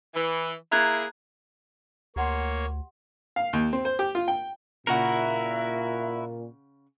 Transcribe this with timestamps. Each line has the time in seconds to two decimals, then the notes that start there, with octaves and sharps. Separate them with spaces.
0.15 E3
0.72 A#3 E4 G#4 A#5 F#6 G#6
2.16 D2 A#3 G4 C#5 F#5 C6
3.36 F5
3.53 D#2
3.73 C4
3.85 C5
3.99 G4
4.15 F4
4.28 G5
4.87 A#2 C#3 E4 F#4 A#4 E5 F#5